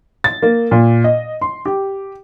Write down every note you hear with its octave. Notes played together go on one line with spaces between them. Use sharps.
A6
A#3
A#2
D#5
C6
G4